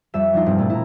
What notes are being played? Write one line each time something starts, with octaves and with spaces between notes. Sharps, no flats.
F2 G3 E5 E7
F3 D4 D#4 F4
E1 G2 C4
A#2 A3
E4 A#5